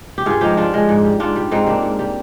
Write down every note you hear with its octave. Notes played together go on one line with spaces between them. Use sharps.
G4
G2 F4 G#4
F3 G#3 D#4 G4
G2 D4 F4
F3 G#3
G#2
G3
G#2 D4 F4
G3
G#2 C4 D#4
G3 A#3 D4
G#2
G3